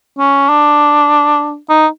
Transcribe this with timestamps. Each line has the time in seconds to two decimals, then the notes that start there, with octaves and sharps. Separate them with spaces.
0.19 C#4
0.49 D4
1.70 D#4